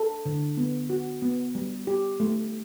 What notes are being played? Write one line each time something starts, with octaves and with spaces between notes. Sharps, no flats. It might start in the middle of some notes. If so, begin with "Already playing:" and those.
Already playing: A4
D3
B3
F#4
B3
G3
G4
A3